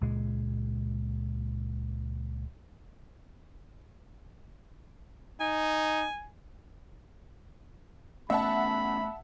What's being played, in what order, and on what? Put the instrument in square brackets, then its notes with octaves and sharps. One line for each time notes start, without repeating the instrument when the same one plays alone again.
[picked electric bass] C#2 A#2 G#3
[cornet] D#4 [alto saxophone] G#5
[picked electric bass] A3 B3 C#4 [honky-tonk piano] E5 F#5 A5 [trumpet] B5